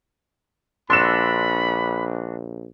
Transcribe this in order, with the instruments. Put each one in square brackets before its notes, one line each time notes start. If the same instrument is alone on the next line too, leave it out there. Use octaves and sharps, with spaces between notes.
[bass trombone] A#1 [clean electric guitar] D4 F#4 [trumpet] B5 [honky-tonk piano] C6 E6 E7